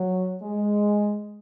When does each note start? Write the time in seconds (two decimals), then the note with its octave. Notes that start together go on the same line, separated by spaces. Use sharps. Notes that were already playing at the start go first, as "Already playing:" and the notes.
Already playing: F#3
0.43 G#3